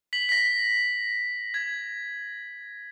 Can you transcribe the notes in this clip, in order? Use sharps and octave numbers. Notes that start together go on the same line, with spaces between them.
B6 F#7
A#6 B6
G#6